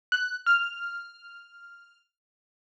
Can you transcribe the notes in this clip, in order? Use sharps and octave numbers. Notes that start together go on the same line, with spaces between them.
F#6
F6